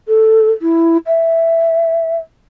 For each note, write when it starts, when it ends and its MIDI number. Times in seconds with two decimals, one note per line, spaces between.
0.08 0.50 69
0.61 0.97 64
1.06 2.17 76